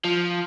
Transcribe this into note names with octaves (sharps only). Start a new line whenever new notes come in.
F3